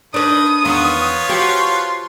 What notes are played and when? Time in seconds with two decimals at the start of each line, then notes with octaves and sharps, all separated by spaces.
0.14 D#3 D4 B4 D#6
0.65 E2 D#3 B3 F4 B4 C#5
1.29 F3 F#4 G4 C6